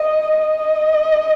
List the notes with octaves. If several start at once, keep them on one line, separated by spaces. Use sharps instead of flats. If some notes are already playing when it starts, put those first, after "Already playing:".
Already playing: D#5
D#5